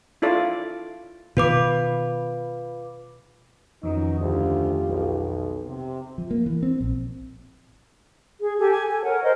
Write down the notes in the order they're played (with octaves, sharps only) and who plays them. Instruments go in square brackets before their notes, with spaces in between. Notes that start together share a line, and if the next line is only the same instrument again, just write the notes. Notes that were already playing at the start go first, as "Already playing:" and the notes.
[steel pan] E4 F4 A4 D5
[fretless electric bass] B2 D#3 B3 [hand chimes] F4 B4 D6
[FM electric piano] F2 D#3 F3 [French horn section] F#3 B3 C#4 [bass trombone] D#4
[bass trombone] D2 [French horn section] C#3 F4 G4
[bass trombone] B1
[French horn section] C3
[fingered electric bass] F3
A#3
E3
C4
A#1
[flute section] G#4
G4 A4 G#5
G#5
A4 G#5
A#4 C#5 F#5
A#4 C5 D#5